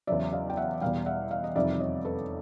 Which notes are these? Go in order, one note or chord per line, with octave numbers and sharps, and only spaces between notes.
E2 C#3 F#3 D5 E5
D#5 F5
G5
E5 F#5
E2 B2 G3 F5 G5
E5 F#5
D#5 F5
D#5
F2 C3 D#3 G3 D5 E5
E5
C#5 D#5
A4 B4